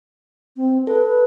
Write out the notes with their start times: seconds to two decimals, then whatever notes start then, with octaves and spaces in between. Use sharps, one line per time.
0.57 C4
0.87 A4 B4
1.02 B4